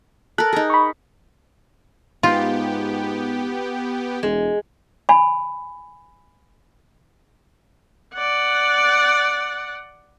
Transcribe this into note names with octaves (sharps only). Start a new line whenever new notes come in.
A4 A#4 F#6
D#4 G#4
B5 C#6
G#2 B3 F4 G4
E1 G#3
G#5 B5
D5 F#5